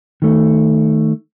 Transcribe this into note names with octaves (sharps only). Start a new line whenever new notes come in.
D#3 A3